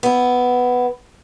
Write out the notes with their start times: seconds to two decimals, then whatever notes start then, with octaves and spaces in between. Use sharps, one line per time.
0.03 B3 E4